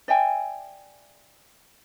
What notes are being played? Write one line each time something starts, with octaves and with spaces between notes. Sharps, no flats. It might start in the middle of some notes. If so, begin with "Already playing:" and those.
D5 E5 G5 G#5